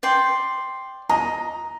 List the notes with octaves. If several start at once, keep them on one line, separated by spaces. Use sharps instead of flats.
D5 G5 C6
D#5 A#5